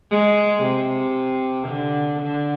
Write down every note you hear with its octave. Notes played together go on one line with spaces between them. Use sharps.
G#3
C3
D3
D3